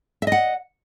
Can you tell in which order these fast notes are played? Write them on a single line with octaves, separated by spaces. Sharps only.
E5 D#5 F#5